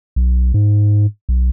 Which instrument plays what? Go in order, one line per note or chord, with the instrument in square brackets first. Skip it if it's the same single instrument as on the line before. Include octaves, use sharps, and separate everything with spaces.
[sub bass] B1
G#2
B1